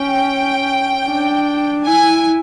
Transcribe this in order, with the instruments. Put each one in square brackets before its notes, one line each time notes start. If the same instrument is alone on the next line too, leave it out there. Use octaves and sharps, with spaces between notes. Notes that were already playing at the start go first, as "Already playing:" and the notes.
Already playing: [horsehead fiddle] C#4 [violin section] G5
[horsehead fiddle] D4
[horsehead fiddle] E4 [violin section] G#5